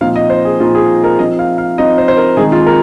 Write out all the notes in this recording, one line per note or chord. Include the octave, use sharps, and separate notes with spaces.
A#2 F3 C4 D#4 F5
D#5
C5
G#4
A#2 F3 C4 D#4 F4
G#4
A#4
F3 C4 D#4 D#5
F5
F5
F3 C4 D#4 D#5
C5
C5
A#4
D#3 G#3 C4 D#4 G#4
F4
A#4